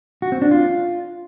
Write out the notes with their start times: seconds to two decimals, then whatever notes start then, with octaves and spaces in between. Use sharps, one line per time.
0.22 F#4
0.32 C4
0.42 D4
0.51 F4